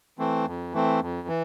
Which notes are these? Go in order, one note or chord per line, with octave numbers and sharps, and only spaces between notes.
E3 A3 C4
F2
E3 A3 C4
F2
E3